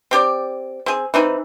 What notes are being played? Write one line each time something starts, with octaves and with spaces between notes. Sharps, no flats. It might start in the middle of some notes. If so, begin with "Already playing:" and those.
C4 G4 D5
C4 G#4
E3 C4 D#4